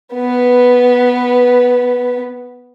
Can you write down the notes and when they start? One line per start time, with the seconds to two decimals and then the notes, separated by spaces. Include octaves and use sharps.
0.15 B3 B4